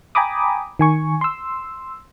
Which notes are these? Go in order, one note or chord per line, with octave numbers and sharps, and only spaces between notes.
G5 G#5 A#5 B5 D6 D#6
D#3 G#5 C#6
C6 E6